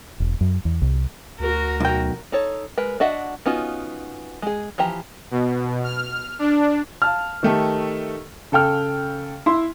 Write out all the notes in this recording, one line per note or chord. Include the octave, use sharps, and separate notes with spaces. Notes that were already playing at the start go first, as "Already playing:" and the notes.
E1
F#2
E2
C2
D2 F#4 A#4
B1 G5
D#4 A4 C#5
G#3 A#4 B4
D4 F#4 D#5 E5 F#5
B3 C#4 D#4 F4 F#4
G#3 G#4
E3 F3 G4 A#5
B2
F6
D4
F5 A5 F6
D#3 A3 G4 A4
C#3 A4 G5 F6
E4 C6